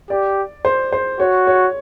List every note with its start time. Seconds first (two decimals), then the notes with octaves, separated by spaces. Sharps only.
0.10 G4 D5
0.65 C5
0.93 C5
1.19 F#4 C#5
1.47 C#5